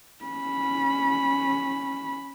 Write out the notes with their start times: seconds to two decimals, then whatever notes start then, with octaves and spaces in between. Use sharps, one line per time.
0.25 C#4 B5